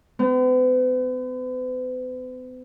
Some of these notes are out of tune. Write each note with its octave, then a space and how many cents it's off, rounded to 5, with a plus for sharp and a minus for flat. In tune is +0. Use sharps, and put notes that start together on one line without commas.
B3 +45